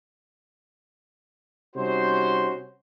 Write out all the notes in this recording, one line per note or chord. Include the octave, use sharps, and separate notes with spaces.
C3 G3 C#4 D#4 F#4 C5